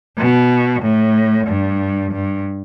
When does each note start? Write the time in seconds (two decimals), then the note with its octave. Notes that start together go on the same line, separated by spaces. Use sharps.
0.18 B2
0.82 A2
1.47 G2
2.12 G2